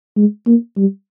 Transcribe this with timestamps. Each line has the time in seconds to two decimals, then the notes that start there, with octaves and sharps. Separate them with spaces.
0.17 G#3
0.46 A#3
0.77 G3